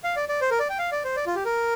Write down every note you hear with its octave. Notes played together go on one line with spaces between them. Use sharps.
F5
D5
D5
C5
A#4
D5
G5
F5
D5
C5
D5
F4
G4
A#4